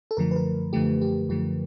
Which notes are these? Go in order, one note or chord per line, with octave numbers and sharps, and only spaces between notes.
A4
F#2 D3 F3 A3 A#4
B4
A#4
F#2 D3 F3 A3 G4
G4
F#2 D3 F3 A3 G4